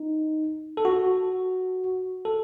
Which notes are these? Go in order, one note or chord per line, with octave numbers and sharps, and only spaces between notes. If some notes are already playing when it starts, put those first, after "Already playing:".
Already playing: D#4
A4
F#4
A4